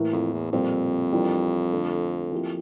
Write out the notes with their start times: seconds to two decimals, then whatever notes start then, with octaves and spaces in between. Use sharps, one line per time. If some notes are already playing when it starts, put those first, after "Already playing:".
Already playing: A2 E3 A#3
0.13 F2
0.33 E2
0.52 F2 A#2 G3 C4 F4
1.12 E3 G3 A#3 D4 F4
1.73 D3 A3 C4
2.32 F3 A#3 E4 G4